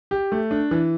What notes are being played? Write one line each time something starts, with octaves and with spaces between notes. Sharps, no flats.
G4
A3
D4
E3